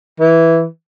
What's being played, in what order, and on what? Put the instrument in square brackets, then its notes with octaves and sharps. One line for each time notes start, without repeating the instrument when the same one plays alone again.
[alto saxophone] E3